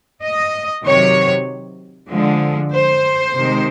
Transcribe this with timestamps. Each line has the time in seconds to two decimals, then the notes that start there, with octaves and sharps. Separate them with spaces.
0.21 D#5
0.84 C3 D#3 F#3 C#5
2.10 D3 F3 G#3
2.73 C5
3.36 C3 D#3 G#3